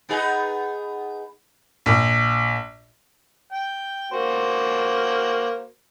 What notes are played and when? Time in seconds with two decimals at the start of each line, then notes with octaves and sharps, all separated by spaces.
0.09 B3 D#4 G#4
1.86 A#1
3.53 G5
4.11 A#3 F#4 C5